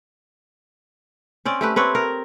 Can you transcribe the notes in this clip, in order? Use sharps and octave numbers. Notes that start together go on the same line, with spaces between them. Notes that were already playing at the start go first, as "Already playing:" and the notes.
C4 C#4 D5
A3 G4 B4
C4 B4 C#5
A#4